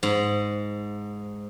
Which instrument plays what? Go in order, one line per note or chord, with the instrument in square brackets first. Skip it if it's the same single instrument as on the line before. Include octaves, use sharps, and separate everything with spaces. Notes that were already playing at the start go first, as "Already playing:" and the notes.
[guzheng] G#2